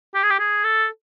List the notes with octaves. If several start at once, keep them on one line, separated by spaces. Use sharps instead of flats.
G4
G#4
G4
G#4
A4